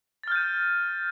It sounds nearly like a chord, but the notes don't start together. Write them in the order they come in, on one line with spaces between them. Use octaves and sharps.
A6 F6 G6 D#7